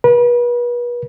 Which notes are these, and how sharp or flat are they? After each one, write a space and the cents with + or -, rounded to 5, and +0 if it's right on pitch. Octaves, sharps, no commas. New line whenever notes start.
B4 -35